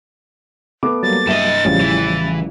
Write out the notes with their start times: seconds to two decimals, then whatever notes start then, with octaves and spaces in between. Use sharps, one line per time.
0.83 A3 B3 D6
1.03 F#3 G3 A#3 A6
1.27 G2 D#5 E5 E7
1.65 A1 C#3 F3 G3 C#4
1.81 E3